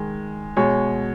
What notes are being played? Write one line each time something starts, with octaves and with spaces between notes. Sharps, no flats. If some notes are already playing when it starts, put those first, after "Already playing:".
Already playing: D#3 G#3
B2 G#3 C#5